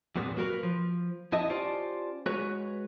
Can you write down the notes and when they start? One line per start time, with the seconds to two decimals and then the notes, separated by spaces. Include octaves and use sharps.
0.16 E2 G2 A#2 B3 C4
0.36 F#3 A#3 F#4 G4 A#4 B4
0.63 F3
1.32 F2 E4 D#5 A5
1.50 C#4 F4 G4 C5 D5 A5
2.26 G#3 F#4 B4 C#5